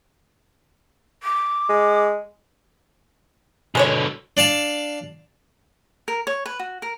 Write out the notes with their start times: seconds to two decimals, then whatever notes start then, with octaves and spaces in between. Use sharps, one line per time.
1.23 D6
1.69 G#3
3.75 B2 D3 G#3 C5 C#5
4.37 D4 D5 F5 A5
6.08 A#4
6.27 C#5
6.46 B4
6.59 F#4
6.82 A#4